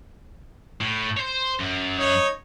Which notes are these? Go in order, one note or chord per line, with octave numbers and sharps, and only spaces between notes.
A2
C5 C#5
F#2
D#4 C#5